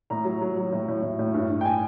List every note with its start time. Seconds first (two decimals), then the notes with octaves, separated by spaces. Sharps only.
0.10 A2 A#5
0.25 F#3
0.41 F#3
0.57 F#3
0.72 A2
0.88 A2
1.02 A2
1.19 A2
1.34 G2
1.49 G2
1.61 G5
1.65 G#5